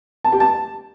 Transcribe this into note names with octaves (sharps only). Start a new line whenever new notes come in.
A5
G4
A5